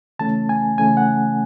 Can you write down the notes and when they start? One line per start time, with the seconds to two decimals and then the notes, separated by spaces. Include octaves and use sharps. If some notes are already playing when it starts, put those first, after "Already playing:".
0.19 C#3 E3 A3 C#4 A5
0.49 G#5
0.78 C#3 E3 A3 C#4 G#5
0.97 F#5